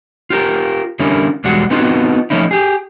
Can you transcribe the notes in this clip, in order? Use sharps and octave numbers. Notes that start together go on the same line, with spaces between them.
F4 G4 A#4
D3 G3 C#4 E4 A#4
B1 E2 G3 G#3 F#4 F#5
B3 C4 D#4 F4 F#4
F3 A3 C#4 D#4 E4
G4 G#4